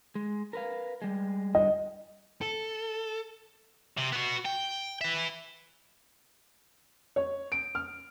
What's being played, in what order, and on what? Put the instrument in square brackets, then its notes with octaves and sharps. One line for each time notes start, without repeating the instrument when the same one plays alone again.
[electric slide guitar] G#3
A#4 B4 F5
G3 G#3
[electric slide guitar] D3 G3 [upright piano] D#5
[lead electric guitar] A4
[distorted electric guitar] C3
B3 F#4
G5
B4 E5
[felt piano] C#5
D7
F6